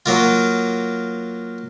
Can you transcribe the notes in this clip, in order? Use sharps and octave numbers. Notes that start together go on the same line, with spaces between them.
F#3 A#3 F4